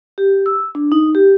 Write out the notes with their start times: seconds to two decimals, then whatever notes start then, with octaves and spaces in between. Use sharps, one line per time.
0.18 G4
0.46 E6
0.75 D4
0.92 D#4
1.15 G4